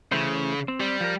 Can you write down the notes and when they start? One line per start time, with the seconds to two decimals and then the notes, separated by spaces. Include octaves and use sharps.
0.12 C#3 E3 A3 C5
0.68 C4
0.80 G3
1.00 F3 A#4